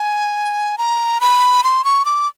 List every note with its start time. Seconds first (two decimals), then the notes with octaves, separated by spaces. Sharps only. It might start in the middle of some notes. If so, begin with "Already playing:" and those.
Already playing: G#5
0.78 A#5
1.21 B5
1.64 C6
1.85 C#6
2.05 D6